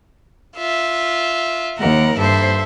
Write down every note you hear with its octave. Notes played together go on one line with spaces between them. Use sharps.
F4 E5
D#2 A#4 F#5
G2 A4 C5 E5